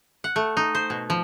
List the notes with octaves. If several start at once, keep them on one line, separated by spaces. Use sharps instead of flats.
F#5
A3
D#4
C5
B2
F3